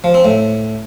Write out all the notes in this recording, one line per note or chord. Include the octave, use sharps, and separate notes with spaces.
F3
C4
A2